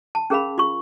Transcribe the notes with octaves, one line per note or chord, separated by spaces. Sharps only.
A5
C#4 G#4 A#4 F5 B5
F4 C#6